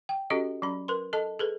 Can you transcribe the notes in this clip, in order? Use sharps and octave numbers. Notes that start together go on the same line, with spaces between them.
G5
C#4 F#4 G4 A4 D#5
F#3 C#4 B5
A#4 B4 C6
A4 D#5 A5
G#4 A4 B4